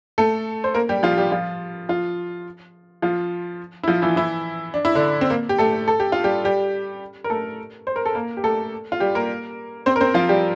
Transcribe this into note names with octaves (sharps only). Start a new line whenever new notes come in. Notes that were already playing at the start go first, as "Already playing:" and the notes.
A3 A4
C5
A#3 A#4
G3 G4
F3 F4
G3 G4
F3 F4
F3 F4
F3 F4
E4
F3 F4
E3 E4
E3 E4
D4
E4
D3 D4
C4
A#3
G4
A3 A4
A4
G4
F4
G3 G4
G3 G4
A#4
A3 A4
C5
A#4
A4
A#3 A#4
G4
A3 A4
F4
G3 G4
A#3 A#4
C4 C5
A#4
C4 C5
F3 F4
G3 G4